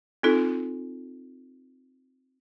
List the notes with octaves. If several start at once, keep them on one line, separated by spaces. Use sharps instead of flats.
C4 D#4 F4 A4